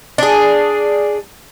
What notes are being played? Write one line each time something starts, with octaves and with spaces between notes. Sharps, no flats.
D4 G#4